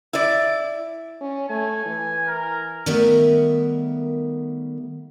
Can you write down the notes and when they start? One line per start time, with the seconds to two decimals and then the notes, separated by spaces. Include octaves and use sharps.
0.13 E4 D5
1.21 C#4
1.50 A3 G#5
1.86 E3
2.27 A#4
2.86 D#3 G3 A3 B3 A#4 E5